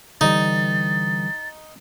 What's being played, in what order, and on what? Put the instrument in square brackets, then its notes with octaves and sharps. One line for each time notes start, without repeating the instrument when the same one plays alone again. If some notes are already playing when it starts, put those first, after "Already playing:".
[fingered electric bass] D3 E3 G3 [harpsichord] D#4 [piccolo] A6